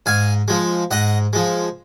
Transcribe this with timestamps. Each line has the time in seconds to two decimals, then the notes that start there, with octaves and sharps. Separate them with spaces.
0.06 G#2 F5 G#5
0.48 F3 G#3
0.91 G#2 D#5 F#5
1.33 F3 G#3